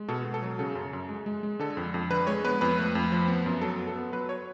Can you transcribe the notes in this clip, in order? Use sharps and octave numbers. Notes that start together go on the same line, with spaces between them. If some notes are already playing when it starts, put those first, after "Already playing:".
Already playing: G#3
B2 A4
B2
A4
F#3
C#3 A4
F#2
F#2
G#3
G#3
G#3
D3 A4
F2
F2
D3 B4
G#3 C#5
B3 B4
F2 B4
A3
F2
F3
B3
F#2
F#3 A4
B3
A4
B3
F#3 B4
C#5